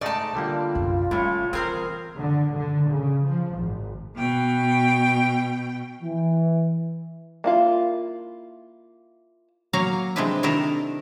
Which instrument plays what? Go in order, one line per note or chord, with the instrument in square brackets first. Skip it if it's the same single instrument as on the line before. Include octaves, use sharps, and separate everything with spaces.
[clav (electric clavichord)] G#2 A3 D#4 [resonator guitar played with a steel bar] D5 A5 [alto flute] C6
[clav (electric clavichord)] D3 G3 A#3 [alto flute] F4
[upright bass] C2 F#2
[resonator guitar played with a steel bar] A2 [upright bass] G3 [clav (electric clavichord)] C#4 C#5 D5
[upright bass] E3 [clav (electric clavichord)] C4 [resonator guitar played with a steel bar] G#4 A#4 C5
[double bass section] D3
D3
C#3
F3
G#1
[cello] B2 G5
[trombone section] E3
[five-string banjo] A#3 E4 F4
[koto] F#3 A#3 C#5 F5 A#5
C3 G#3 C4 D4 E4 B4
C3 D#3 D4 E4 A4 A#4